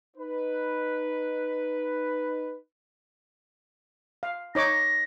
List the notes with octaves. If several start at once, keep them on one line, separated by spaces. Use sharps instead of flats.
D#4 B4
F5
D#4 C#5 D6 A#6